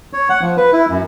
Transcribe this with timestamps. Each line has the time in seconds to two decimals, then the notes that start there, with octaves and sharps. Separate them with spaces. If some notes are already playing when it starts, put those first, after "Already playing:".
0.13 C#5
0.29 F#5
0.41 F3
0.57 B4
0.73 E4
0.89 F#2